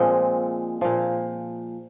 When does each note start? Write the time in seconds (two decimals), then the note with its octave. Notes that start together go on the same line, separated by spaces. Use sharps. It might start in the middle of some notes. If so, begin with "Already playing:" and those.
Already playing: A#2 F3 G#3 C4 F4
0.81 A#2 F3